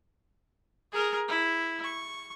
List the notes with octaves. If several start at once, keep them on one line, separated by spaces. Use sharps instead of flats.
G#4 A#4
E4
C#6